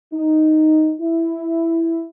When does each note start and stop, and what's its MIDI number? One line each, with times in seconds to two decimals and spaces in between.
0.13 0.93 63
1.01 2.05 64